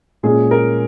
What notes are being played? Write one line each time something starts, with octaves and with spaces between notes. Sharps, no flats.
A#2 G#3 C#4 G#4
A#4